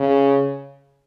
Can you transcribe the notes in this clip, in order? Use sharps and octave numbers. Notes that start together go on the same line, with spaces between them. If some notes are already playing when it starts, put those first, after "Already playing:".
Already playing: C#3